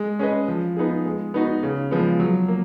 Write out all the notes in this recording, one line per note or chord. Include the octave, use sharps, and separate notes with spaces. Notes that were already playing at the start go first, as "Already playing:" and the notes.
Already playing: G#3
C#4 G#4 B4 D#5
F3
B3 D#4 G#4
G#3
B3 D#4 F#4
C#3
F3 G#3 B3
F#3
A#3